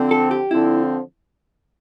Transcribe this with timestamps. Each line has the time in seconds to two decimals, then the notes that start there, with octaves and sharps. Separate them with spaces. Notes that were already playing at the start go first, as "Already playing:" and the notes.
Already playing: D3 F3 C4
0.11 A4
0.31 G4
0.51 D3 F3 C4 E4